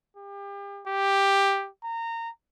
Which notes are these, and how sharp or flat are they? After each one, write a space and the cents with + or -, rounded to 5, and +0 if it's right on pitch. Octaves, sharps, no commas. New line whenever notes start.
G4 +35
G4 +5
A#5 -20